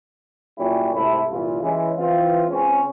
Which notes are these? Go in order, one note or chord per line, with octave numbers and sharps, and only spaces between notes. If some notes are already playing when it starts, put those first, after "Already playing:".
A#2 F#3 G3 C#4 E4 G4
C2 G#2 C3 A3 E4
C2 F#2 A#2 E3 F4
C#3 E3 G#3
E3 C4 F4
C#2 C#3 C4 C#4